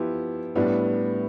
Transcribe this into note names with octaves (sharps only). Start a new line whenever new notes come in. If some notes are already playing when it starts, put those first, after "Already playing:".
Already playing: F3 B3 E4 G4
A2 G3 B3 D4